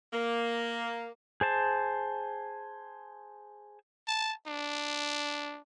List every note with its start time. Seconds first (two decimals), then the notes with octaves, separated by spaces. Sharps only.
0.14 A#3
1.41 G#4 C5 A5
4.08 A5
4.47 D4